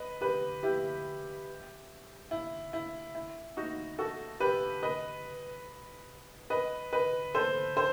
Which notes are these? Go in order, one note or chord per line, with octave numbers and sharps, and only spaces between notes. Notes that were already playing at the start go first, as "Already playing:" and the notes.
Already playing: B4 D#5
G4 B4
E4 G4
E4
E4
E4
D#4 F#4
F#4 A4
G4 B4
B4 D#5
B4 D#5
B4 D#5
A4 C5
A4 C5